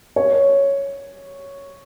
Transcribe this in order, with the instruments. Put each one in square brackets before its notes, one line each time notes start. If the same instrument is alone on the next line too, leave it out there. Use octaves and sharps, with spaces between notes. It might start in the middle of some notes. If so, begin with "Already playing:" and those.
[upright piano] C#5